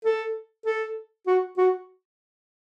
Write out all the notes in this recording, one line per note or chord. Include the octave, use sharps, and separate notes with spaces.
A4
A4
F#4
F#4